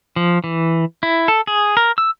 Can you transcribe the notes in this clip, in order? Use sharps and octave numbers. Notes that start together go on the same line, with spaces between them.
F3
E3
E4
A4
G#4
A#4
E6